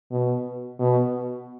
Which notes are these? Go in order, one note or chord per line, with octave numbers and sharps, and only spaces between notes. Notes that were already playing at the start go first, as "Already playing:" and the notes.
B2
B2